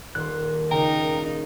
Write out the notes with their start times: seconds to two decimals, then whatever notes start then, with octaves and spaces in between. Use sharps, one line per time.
0.15 D#1 D#2 C6 F#6
0.71 A#2 C#3 D#4 A#4 G5